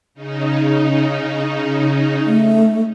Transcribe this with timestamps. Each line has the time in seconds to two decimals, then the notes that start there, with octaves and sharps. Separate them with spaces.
0.14 C#3 D#4
2.26 A3